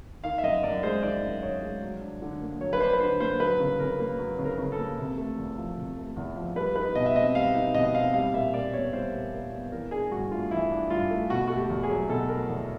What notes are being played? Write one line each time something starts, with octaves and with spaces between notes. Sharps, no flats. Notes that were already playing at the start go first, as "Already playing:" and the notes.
D#3 F5
E5
F#2 D#5
F#2 D5
G#3 C5
D#3 D5
F#2
F#2 C#5
G#3
F#3
D4
D3
A#3
F#3 C#5
B4
D4 C5
B4
D3 C5
A#3 C5
F#3 B4
C#3
C#3 A#4
A#3
F#3
C#3
A#4
C#3
A4
A#3
C3
A3
E2
F3
C3
A3
E2
F3
G3 B4
D#4 B4
B2 D#5
E5
C4 D#5
G3 F5
D#4
B2 D#5
C4 F5
G3 F5
A#2 E5
A#2 D5
B3 C#5
G3 C5
A#2
A#2
B3
E3 A#4
D4 G#4
G2 F#4
A3 F4
E3 E4
D4
G2 F4
A3
B2 F#4
A3 F#4
G4
E2
G#4
F#3
B2 A4
A3 A#4
E2